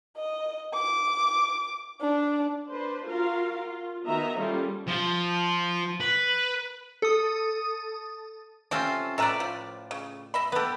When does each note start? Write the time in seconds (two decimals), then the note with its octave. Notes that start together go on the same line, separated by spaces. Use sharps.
0.17 D#5
0.73 D6
2.01 D4
2.72 D4 B4 C5
3.07 F4 F#4 A#4 F5
3.60 F4
4.07 D#3 B3 F#4 D#5 E5 A#5
4.39 G3 A#3 C#4 F4 G#4 A4
4.88 F3
6.00 B4
7.02 A4 D#6
8.71 C3 F3 C4 C#4 F4 A4
9.18 A2 A4 B4 D5 E5 A#5
9.40 F3
9.91 C#3
10.34 D#5 E5 B5
10.52 B3 G4 A4 B4